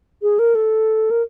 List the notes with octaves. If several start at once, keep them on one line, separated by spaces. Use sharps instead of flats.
G#4
A#4
A4
A#4